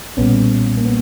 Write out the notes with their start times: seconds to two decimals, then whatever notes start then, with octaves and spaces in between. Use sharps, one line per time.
0.17 B1 A#2 G3 B3 C#4
0.77 A#3
0.85 B3